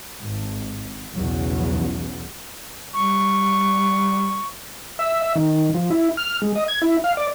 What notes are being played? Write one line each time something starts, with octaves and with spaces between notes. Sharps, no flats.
G#1
B1 E2 C#3 F#3
G3 C#6
E5
E5
D#3
F3
E4
F6
G#3
D#5
G#6
E4
F5
D5